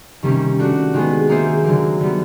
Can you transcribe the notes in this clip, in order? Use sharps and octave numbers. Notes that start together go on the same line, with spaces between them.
C3 D#3 G3 A#3 C#4
A3 D4 F#4
D#3 G#3 B3
A#3 D#4 G#4 C5 E5
D3 F#3 A#3
D3 G3 B3